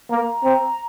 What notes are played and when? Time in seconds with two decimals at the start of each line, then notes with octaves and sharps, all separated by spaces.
0.10 A#3 A#5
0.44 C4